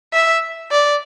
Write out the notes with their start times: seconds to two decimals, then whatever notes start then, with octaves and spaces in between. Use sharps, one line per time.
0.13 E5
0.71 D5